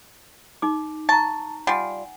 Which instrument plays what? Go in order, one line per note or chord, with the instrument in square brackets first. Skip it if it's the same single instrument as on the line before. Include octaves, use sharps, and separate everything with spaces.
[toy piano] D#4 D6
[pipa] A5 [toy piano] A#5 C#6
[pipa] G3 F4 [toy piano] F#5 G#5